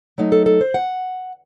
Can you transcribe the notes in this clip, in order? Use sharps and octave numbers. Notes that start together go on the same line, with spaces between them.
F#3 A3 D#4
A4
A4
C5
F#5